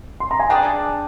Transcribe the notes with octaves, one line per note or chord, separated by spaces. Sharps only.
C6
A#5
G#5
D4 G#4 D5 G5